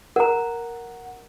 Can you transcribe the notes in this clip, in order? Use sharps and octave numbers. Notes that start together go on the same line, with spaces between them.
A#4 F#5 A#5